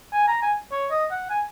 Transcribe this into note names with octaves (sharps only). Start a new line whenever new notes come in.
G#5
A#5
G#5
C#5
D#5
F#5
G#5